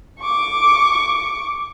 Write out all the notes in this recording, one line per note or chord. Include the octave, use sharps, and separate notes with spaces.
C#6 D6